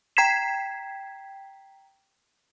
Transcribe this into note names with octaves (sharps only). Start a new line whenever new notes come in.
G5 A#5 G#6 B6 C7 E7